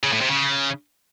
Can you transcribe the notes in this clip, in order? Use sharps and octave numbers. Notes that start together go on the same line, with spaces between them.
C#3
A2
C3
C#3